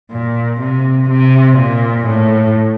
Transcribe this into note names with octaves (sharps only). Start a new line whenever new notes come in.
A#2
C3
C3
A#2
A2